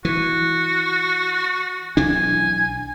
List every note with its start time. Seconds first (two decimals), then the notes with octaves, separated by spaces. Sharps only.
0.05 E3 F#4
1.97 B1 E3 D4 G#5